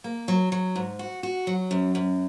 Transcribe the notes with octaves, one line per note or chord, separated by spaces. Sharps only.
A#3
F#3
F#3
G#2
F#4
F#4
F#3
F#2
F#2